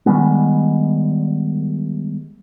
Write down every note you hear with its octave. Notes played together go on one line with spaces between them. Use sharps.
D#3 G3 G#3 B3